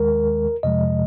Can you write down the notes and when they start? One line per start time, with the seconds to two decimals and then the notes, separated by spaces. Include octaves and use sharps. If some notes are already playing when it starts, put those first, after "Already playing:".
Already playing: D#2 D#3 G#3 A#4
0.63 F2 C3 F3 G#3 D#5